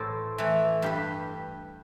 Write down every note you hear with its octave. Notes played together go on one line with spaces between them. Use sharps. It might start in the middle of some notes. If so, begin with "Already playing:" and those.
Already playing: A2 E3 A4 C5
E3 A3
G2 G4 B4